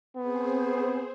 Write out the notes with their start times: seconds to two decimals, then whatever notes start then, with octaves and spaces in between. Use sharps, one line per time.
0.16 B3 C4 G#4 C5